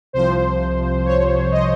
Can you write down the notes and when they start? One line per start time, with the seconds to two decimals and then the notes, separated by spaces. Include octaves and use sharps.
0.13 C2 C3 F3 C5
1.05 C#5
1.51 D#5